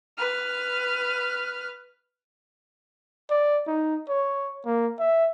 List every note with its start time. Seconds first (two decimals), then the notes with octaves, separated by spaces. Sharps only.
0.17 B4 F6
3.30 D5
3.67 D#4
4.09 C#5
4.66 A#3
4.99 E5